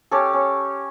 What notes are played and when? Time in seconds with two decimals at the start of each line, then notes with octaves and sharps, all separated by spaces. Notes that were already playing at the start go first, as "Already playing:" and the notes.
0.11 C#4 G4 A4
0.33 C#4